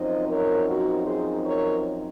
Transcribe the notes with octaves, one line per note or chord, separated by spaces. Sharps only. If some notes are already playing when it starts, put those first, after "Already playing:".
Already playing: F#2 F3 C4 D#4 C5 D#5
A#4 C#5
F#4 A#4
G#4 C5
A#4 C#5